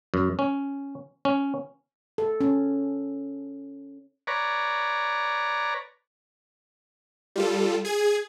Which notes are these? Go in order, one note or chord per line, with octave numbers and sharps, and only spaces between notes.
F#2
C#4
C#4
A4
C#4
B4 C#5 D5 A#5
G3 F4 A4
G#4 G#6